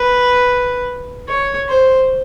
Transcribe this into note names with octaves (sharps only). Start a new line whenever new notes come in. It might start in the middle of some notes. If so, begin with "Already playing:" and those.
Already playing: B4
C#5
C5